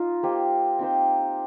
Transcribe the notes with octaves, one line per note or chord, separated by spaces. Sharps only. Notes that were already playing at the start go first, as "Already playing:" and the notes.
Already playing: D#4 F4
A#3 G4 C5 D#5
C4 D#4 G4 C5